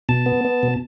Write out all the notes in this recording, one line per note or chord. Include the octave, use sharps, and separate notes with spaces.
B2 A5
B3
B3
B2